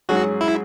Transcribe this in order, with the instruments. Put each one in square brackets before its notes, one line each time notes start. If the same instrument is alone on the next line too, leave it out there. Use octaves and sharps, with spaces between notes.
[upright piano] G#2 F#3 C#4 G#4 [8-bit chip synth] F#4
[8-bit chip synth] E4